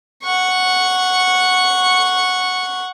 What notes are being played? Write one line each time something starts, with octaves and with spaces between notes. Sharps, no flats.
F#5 C#6